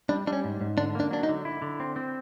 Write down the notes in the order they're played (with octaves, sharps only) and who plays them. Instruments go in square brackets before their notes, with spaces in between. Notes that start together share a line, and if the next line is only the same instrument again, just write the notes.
[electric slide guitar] G3 [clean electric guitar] D4
[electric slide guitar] G3 [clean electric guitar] D4
[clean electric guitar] C#4
[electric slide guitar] G#2
G#2
[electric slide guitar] D3 [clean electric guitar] D4
[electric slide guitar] A#3 [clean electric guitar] D4
[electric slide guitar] F#3 [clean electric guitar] D4
[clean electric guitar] D#4
[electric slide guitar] D3
E4
D3
C4
C4